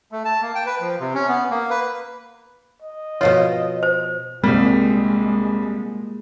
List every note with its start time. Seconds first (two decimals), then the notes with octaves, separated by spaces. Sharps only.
0.12 A3
0.25 A5
0.42 A#3
0.55 G5
0.66 B4
0.80 F3
1.00 C3
1.14 C#4
1.28 B3
1.51 A#3
1.70 B4
2.82 D#5
3.21 B2 F3 F4 C#5
3.83 C5
4.44 C2 G3 G#3 A#3